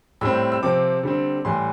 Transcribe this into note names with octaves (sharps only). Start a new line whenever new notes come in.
A2 G3 C4 E6
E6
C3 F3 C4 D6
D3 G3 C4
A2 E3 G3 C6